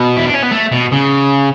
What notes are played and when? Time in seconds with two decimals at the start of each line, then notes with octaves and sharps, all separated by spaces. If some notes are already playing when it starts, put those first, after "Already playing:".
Already playing: B2
0.18 E4
0.26 D4
0.35 C#4
0.43 B3
0.52 A3
0.72 B2
0.92 C#3